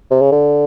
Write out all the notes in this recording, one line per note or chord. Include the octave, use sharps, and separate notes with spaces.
C3
C#3
D3